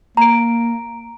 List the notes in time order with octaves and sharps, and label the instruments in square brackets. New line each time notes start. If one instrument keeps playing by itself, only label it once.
[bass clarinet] A#3 [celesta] A#5 D7